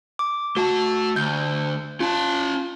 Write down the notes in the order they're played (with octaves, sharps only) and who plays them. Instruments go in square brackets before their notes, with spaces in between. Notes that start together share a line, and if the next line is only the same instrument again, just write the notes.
[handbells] D6
[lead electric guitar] A3 A5 [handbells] F#4
[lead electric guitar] D2 [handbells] G6
[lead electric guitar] C#4 A5 [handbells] F4